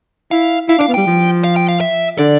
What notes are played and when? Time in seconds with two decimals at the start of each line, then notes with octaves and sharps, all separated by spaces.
0.31 E4 F5
0.69 E4 F5
0.78 D4
0.81 F5
0.88 B3
0.94 G3 G5
1.06 F3
1.44 F5
1.56 G5
1.69 F5
1.81 E5
2.19 D3 D5